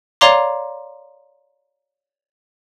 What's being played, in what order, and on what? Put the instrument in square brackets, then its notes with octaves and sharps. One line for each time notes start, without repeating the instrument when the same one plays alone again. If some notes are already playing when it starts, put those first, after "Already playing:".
[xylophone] C#5 D5 F5 A#5 C6 D6